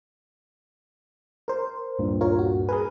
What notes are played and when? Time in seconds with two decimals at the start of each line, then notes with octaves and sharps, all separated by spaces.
1.48 A#4 C5
1.99 D2 G2 A#2
2.21 F4 A#4 C#5
2.39 F#4
2.69 G#4 A#4 B4 G#5